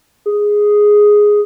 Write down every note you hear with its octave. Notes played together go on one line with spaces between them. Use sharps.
G#4